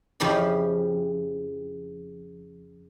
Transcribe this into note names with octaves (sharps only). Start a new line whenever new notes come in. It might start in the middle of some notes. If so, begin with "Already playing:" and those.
F2 C#3 F3 E4 G4